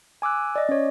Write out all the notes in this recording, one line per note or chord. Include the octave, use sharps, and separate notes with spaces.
G#5 D6 E6 F#6
D5 D#5
C#4 C#5